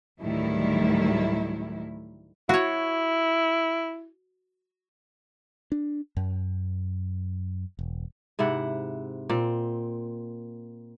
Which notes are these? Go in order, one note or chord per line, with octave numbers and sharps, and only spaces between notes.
D2 A2 D#3 F#3 G3 E4
E4 F#4 C#5
D4
F#2
E1
G#2 C3 E4 F#5
A#2 C4